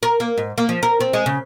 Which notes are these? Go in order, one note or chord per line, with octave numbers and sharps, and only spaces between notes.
A#4
A#3
G#2
A#3
F3
A#4
C4
G#3
C#3